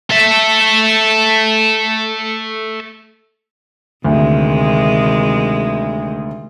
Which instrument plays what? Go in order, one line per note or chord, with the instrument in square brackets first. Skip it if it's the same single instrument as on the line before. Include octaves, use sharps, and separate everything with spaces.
[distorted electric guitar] A4 E5
[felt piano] D2 [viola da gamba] C3 D#3 G#3